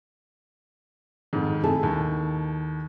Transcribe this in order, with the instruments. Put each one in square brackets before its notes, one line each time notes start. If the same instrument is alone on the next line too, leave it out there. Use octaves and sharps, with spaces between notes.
[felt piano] F2 G#2 D#3
[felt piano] C3 A3 [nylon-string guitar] E4 G#4 A4
[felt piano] D#2 D#3